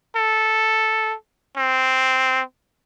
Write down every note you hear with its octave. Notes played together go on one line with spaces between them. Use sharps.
A4
C4